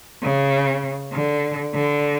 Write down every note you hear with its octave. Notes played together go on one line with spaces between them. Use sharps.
C#3
D3
D3